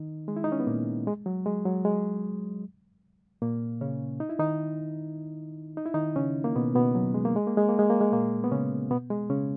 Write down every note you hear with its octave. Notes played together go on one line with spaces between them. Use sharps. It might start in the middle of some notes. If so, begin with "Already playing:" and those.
Already playing: D#3 D#4
G#3
E4
D#4
C#4
B3
A#2 A#3
G#3
F#3
G#3
F#3
G#3
A#2 A#3
C#3 C#4
D#4
E4
D#3 D#4
D#4
E4
D#3 D#4
C#3 C#4
A#3
B2 B3
B2 B3
F#3
G#3
A#3
G#3
A#3
G#3
A#3
G#3
A#3
G#3
A#2 A#3
B3
C#3 C#4
B2 B3
G#3
C#3 C#4